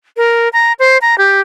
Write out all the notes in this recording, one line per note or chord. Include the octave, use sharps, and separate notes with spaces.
A#4
A#5
C5
A#5
G4